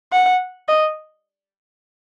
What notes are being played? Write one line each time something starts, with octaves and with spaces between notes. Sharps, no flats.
F#5
D#5